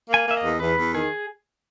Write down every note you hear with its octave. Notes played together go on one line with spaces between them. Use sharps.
A#3
G#5
A#3 E5
D#5
E2
E2 B4
E2
D#3 G#4